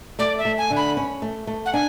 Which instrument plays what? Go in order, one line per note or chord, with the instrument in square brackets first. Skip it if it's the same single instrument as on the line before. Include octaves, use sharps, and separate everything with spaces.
[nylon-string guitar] A3 [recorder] D5
[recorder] E5
[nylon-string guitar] A3
[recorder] G#5
[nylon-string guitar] D3
[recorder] B5
[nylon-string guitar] C#4
A3
A3
[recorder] F#5
[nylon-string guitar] D4 [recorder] G#5